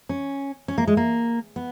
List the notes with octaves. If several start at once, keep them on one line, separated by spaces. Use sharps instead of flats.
C#4
C#4
A#3
G#3
A#3
B3